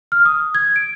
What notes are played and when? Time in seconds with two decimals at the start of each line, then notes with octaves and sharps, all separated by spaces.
0.12 F6
0.26 D#6
0.55 G#6
0.76 D7